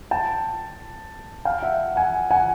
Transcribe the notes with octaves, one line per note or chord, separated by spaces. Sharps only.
G5 A5
F5 G5
E5 F#5
F#5 G#5
F#5 G#5